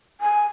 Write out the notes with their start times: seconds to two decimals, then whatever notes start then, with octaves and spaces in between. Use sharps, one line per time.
0.21 G#5